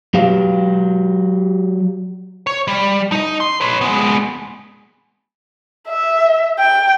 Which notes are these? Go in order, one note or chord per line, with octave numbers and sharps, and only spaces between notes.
F#3 G4 F5
C#5
G3
D#4 D#5
C6
B4 C#5
G#3 B3
E5
G5